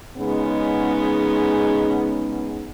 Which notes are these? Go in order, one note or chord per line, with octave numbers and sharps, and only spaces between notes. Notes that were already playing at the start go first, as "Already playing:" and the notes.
C#3 G#3 B3 C#4 D#4